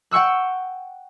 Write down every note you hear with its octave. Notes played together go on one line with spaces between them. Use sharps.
F#5 G5 C#6 E6 F#6